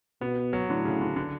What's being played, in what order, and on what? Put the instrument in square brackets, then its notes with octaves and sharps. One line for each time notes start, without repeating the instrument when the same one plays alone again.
[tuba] B2 [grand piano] B3
[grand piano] F#3
[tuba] A2 [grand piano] D3
[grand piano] C#3
D3
D3